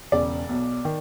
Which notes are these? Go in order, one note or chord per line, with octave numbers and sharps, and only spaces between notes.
E1 E2 C#3 D5
B1 B2
D#3